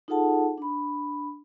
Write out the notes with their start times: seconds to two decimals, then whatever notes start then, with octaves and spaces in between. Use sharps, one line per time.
0.08 D#4 F4 G#4 A4 F#5 A5
0.58 D4 B5